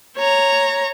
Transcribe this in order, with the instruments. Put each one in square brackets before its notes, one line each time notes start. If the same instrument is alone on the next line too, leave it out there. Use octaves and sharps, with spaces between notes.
[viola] C#5 A#5